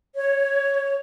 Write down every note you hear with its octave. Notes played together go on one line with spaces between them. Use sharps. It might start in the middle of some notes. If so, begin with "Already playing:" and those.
C#5